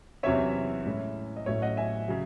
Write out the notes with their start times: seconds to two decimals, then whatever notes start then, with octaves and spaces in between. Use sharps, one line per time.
0.23 E2 C3 F#3 C#4 E4 C#5 E5
0.85 A2 G#3 C#4 E4
1.36 D#5
1.46 A1 A2 F#3 C#4 C#5 E5
1.62 D#5 F#5
1.77 E5 G#5
2.08 C#3 F#3